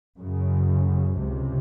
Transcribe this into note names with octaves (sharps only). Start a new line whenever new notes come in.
F#2 C#3
C#2 C3